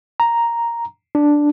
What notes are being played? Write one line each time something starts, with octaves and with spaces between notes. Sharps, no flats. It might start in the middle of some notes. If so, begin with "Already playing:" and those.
A#5
D4